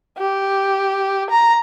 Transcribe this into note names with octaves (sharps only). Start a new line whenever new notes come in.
G4
A#5